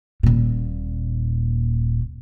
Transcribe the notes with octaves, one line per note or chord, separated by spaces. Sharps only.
D#1 A#2